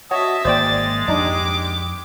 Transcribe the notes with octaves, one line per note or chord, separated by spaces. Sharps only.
F#4 C#5 D#5 E5 A5
G#1 G#3 A#3 C5 D5 G5 A6
F2 D4 D#4 G4 D6